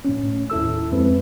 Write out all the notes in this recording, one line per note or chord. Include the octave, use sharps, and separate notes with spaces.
A2 C#4
D#2 E4 A4 E6
F2 G#3 C4 B4